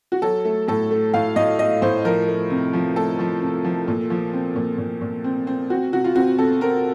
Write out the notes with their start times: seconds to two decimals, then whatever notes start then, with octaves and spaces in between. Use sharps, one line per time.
0.12 F#4
0.22 F#3 A4
0.45 A3
0.68 A2 A4
0.91 A3
1.14 A2 F5
1.36 A2 D#5
1.59 A3 D#5
1.82 A2 C5
2.05 F3 A#4
2.27 A3
2.50 C3
2.73 F3
2.96 A3 A4
3.19 F3
3.42 C3
3.65 F3
3.88 A#2
4.10 F3
4.33 C4
4.56 A#2
4.78 A#2
5.01 A#2
5.24 C4
5.47 C4
5.70 C4 F#4
5.93 C3 F#4
6.04 F4
6.15 C4 F#4
6.38 C3 A4
6.61 C4 A#4